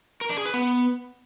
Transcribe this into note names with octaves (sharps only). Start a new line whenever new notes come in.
A#4
D4
G#4
B4
B3